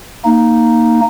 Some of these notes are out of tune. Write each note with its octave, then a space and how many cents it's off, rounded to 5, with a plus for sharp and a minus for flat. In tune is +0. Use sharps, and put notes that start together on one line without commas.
A#3 +0 D#4 +0